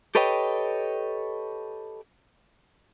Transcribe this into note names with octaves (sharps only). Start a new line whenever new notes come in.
G4 A4 B4 C#5 D#5 G5